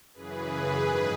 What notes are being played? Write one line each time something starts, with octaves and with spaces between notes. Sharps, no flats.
F#2 C#3 E3 G#4 B4
G#2 D#3